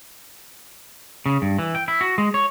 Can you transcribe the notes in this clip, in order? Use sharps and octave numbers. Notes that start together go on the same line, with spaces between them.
C#3
G2
E3
G5
E4
F#4
G#3
C#5